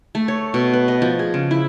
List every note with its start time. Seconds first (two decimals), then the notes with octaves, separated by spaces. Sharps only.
0.15 A3
0.28 C#5
0.54 B2
0.73 B4
0.88 D#5
1.02 F3
1.19 G#4
1.34 C#3
1.51 E4